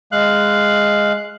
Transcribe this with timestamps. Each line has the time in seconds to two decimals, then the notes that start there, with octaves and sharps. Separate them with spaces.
0.12 G#3 F5 F#6